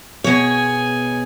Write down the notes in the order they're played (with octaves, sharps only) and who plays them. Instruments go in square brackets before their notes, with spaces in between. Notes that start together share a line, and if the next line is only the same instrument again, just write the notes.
[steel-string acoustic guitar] B2 C#5 [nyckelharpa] G#4 G#5